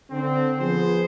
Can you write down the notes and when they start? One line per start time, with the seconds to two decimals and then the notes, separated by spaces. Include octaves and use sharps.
0.11 D3 C4
0.60 F3 B3 G#4 C5